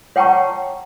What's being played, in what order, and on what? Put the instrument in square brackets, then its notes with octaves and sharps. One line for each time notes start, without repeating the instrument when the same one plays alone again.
[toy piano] C#5 F#5 G5 A5 A#5 C#6